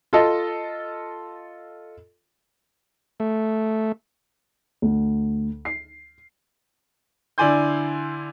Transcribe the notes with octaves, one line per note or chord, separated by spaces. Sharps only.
F4 A4 D#5
A3
D2
C7
D3 E4 D5 G#5 C6 G6